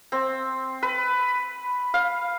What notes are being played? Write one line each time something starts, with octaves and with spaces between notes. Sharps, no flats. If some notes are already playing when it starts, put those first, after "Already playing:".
C4
B4
F5